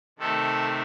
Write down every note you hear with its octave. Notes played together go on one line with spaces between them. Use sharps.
C3 D#3 A3 A4